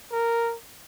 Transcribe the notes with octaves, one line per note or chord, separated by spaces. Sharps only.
A#4